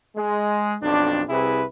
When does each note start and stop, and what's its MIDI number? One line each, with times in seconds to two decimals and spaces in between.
0.16 0.75 56
0.81 1.21 35
0.81 1.21 41
0.81 1.21 62
1.28 1.63 36
1.28 1.63 48
1.28 1.63 64
1.28 1.63 68
1.28 1.63 71